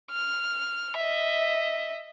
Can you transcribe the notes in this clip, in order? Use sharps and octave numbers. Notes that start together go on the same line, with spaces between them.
F6
D#5 E5